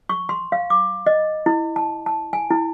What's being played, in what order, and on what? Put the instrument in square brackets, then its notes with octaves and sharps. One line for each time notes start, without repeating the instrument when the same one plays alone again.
[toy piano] C#6
C6
F5
D6
D#5
E4
A5
A5
G#5
E4